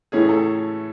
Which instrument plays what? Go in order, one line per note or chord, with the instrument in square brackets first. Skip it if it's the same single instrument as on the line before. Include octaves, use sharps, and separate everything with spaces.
[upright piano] A2 E3 A3 C#4 G#4
A4